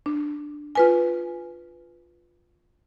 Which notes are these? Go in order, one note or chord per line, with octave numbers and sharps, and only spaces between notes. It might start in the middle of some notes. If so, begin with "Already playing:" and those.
D4
F4 B4 G#5